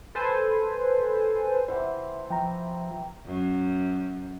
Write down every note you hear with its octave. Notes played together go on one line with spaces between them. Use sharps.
A4 B4 C5 G#5
C3 E3 C5 F#5
F3 G5 A#5
F#2